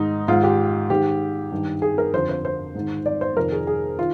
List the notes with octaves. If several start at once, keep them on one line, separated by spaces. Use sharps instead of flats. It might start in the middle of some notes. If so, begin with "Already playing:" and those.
Already playing: G#2 D#3 D#4
G#2 D#3 F4
G4
G#2 D#3 G4
G2 D#3
G#4
A#4
F2 D3 C5
C5
C5
G#2 D#3
D5
C5
F2 C3 D#3 A#4
G#4
G#4
D#3 F4